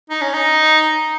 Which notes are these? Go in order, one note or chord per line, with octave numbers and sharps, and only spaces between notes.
D#4
C#4
D#4